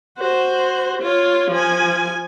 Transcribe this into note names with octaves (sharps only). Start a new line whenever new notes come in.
F#4 C5
F4 C#5
F3 G#5